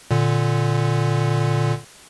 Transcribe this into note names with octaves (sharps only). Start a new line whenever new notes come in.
A#2 D3